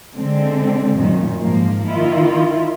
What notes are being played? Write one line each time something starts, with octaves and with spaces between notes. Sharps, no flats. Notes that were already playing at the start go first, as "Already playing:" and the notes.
D3 G#3 C4
F#2 A#2 D#3
G#2 F3 A#3
D#3 E4 F4